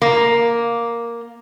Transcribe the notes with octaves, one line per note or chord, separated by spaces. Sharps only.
A#3